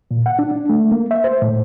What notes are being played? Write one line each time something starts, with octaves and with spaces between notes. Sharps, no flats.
A#2
F#5
D4
D4
A3
A#3
E5
C5
A2